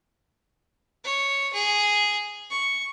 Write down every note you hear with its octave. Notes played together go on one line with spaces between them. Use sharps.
C#5
G#4
C#6